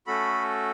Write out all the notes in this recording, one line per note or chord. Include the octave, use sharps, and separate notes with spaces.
A3 C#4 F#4 A4 B5